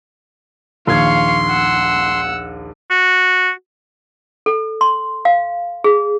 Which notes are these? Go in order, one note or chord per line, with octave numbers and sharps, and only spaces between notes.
A#1 D#2 F5 C6 C#6 G#6
F#5 E6
F#4
A4
C6
F5
G#4